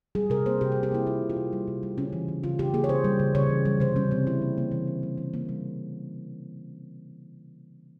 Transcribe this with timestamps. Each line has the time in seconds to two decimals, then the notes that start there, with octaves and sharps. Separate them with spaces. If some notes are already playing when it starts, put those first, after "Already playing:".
0.15 G3 G#4
0.30 C3 A#4
0.46 A#3 C5
0.61 C3 G4
0.72 G3 G#4
0.83 G4
0.92 A#3 E4
1.06 C3 F4
1.22 C3
1.30 F4
1.36 C3
1.53 G3
1.68 C3
1.83 G3
1.98 C#3 C#4
2.13 E3
2.28 C#3
2.44 C#3 F4
2.59 C#3 G4
2.74 A#3 G#4
2.84 C#5
2.89 C#3 C5
3.04 G3
3.19 C#3
3.35 C#3 C#5
3.50 E3
3.65 G3
3.80 C3 C5
3.96 G3 C#4
4.11 C3 C4
4.26 C3 E4
4.42 A#3
4.58 A#3
4.72 E3
4.88 G3
5.03 G3
5.18 E3
5.34 A#3
5.49 G3